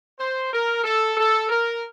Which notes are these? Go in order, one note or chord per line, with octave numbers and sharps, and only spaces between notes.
C5
A#4
A4
A4
A#4